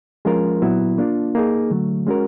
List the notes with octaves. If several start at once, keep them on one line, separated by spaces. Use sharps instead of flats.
F3 G#3 C#4 F4 A#4
A#2 F#3 B3 E4
A#3 D4 F4
A#3 D#4 G#4
D3 F#3 A3
G#3 C#4 F#4 A#4